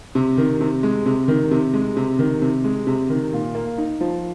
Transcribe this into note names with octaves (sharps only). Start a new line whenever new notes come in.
C3
D#3
C3
G#3
C3
D#3
C3
G#3
C3
D#3
C3
G#3
C3
D#3
A#2
A#3
D#4
F3